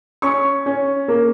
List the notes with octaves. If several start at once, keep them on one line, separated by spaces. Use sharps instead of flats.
C#4 C#6
C#4
A#3